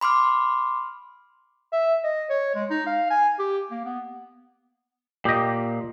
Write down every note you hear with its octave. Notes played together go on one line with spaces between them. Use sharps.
B5 C6 D6 F6
E5
D#5
C#5
G#3
D#4
F5
G#5
G4
A#3
B3
A#2 G4 D#5